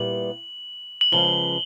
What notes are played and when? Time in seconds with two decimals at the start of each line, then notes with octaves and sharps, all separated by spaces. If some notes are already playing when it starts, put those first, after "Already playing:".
Already playing: A#2 G3 B3 E4 G4 F#7
1.01 F#7
1.12 C#3 F3 G#3 B3 G7